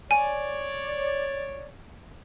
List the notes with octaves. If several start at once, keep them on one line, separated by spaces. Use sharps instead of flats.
C#5 D5 G#5